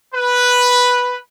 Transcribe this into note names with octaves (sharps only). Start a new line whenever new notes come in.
B4